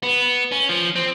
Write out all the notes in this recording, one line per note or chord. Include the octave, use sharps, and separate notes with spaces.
B3
C#4
F3
C4